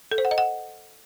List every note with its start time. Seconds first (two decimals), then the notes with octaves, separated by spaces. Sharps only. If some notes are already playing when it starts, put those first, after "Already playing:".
0.12 A4
0.18 C5
0.25 F#5
0.31 D#5
0.38 F#5